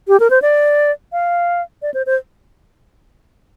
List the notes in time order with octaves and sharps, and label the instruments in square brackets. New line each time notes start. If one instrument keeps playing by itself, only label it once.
[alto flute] G4
A#4
C5
D5
F5
D5
C5
C5